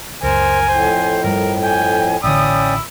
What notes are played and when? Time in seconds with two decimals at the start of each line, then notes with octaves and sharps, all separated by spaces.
0.23 C#2 F#2 A#4 C5 G#5
0.69 F2 A2 C5
1.24 G2 F3 G3 A#4
1.63 G5 G#5
2.24 A1 D3 C#4 E4 D5 G5 D#6